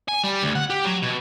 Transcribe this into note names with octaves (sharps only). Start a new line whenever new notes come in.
G#5
G3
D2
F#5
G4
F#3
B2